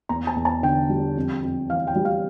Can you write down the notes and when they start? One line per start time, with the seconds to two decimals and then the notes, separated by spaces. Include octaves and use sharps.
0.09 E2 A#5
0.27 A5
0.36 E2
0.45 A5
0.63 D3 G5
0.90 G3
1.16 F2
1.43 F2
1.69 E3 F5
1.87 G5
1.95 G3
2.05 F5